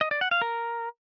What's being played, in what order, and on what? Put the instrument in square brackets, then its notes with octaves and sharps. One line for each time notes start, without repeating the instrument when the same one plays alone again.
[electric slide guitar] D#5
D5
F#5
F5
A#4